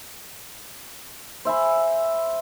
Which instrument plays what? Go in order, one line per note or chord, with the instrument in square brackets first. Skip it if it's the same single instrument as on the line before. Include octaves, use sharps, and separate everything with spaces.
[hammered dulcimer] C5 E5 G#5 B5